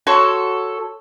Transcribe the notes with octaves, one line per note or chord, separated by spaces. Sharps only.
F#4 A4 C#5 C6